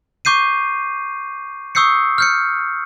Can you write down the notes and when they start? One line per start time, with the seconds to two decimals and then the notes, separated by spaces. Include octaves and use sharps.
0.25 C#6 D6 G6 C7 D#7
1.75 C#6 D#6 E6 G6 C7 C#7
2.18 F6 G6 C#7